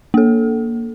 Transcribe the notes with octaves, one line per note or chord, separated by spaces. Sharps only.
A#3 A4